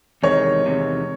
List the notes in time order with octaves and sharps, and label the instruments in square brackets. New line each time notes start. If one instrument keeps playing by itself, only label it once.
[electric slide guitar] E2 C3 D#3 G#3 [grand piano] C#5
[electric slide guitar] E2 C3 D#3 G#3